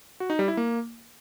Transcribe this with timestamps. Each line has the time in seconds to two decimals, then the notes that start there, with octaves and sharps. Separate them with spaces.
0.20 F#4
0.30 D#4
0.39 G3
0.48 E4
0.57 A#3